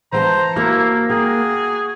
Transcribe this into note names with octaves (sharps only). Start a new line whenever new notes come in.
E3 C5 G5 A5 A#5
A#3 E4 F#4
F#4 G#4 G5